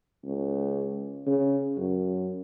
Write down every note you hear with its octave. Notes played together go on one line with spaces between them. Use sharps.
C#2
C#3
F#2